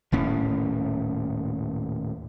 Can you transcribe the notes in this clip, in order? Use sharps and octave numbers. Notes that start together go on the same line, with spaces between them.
D#1 A2 C#4